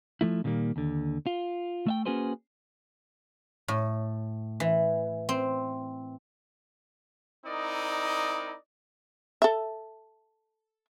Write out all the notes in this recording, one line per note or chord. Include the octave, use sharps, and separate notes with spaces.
F3 A3 E4
A#2 D3 D#3 G3 A#3
D#2 D3
F4
A3 E5 G5
A#3 C#4 F#4 G#4 B4 C5
A2
E3
C4
C4 D#4 E4 A#4 D5 D#5
A4 E5